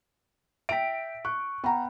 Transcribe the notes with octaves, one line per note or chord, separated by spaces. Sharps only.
E5 G5 B6 D7
C#6 F#6
B3 F#5 G5 A#5 B5